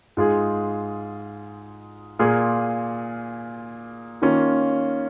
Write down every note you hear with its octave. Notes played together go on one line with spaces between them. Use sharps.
G#2 G#3 F4 G#4
A#2 A#3 F4 G#4
D#3 A#3 C#4 F4